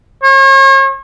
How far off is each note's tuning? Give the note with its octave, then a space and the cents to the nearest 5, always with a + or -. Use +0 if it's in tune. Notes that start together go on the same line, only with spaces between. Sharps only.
C#5 -40